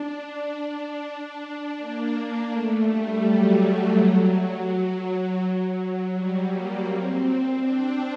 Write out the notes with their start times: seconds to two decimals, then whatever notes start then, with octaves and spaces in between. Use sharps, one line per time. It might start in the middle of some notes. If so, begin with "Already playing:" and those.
Already playing: D4
1.78 A#3
2.15 A#3
2.51 A3
2.87 G3
3.24 F#3
5.42 F#3
6.14 G3
6.50 A#3
6.87 C4
7.59 D4